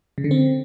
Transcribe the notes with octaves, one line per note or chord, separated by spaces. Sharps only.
C#3
D3
C4